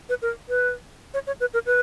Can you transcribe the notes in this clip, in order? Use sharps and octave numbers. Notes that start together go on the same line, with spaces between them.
B4
A#4
B4
C#5
C#5
B4
A#4
B4